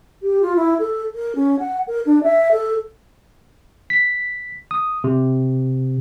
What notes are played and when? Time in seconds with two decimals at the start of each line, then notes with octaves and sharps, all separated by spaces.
0.22 G4
0.42 F4
0.56 E4
0.79 A4
1.15 A#4
1.35 C#4
1.59 F#5
1.87 A#4
2.06 D4
2.23 E5
2.51 A4
3.90 B6
4.71 D#6
5.04 C3